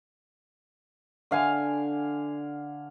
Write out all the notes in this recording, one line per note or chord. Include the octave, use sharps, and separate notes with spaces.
D3 F5 G#5